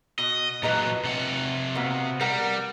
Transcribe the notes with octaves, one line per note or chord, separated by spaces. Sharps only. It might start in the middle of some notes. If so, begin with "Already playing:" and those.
B2 D#5
A#2 F#3 B4 D#5 A#5
C3 F#5
B2 A#3 B3
G3 A#4 F#5